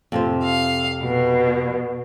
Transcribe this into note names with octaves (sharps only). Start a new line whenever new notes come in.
F2 C3 C5
F5
B2